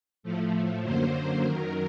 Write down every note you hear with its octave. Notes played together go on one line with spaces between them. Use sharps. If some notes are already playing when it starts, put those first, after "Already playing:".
A2 F3 A3
F#2 D3 F#3 A#3 C5
F#2 D#3 F#3 A#4